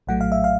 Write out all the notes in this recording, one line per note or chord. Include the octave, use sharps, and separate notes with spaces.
A#1 A2 F#3 A3 F#5
F5
E5
F5